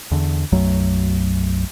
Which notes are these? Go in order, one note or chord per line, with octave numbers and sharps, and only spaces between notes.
E2 D3
B1 F#2 F#3 A3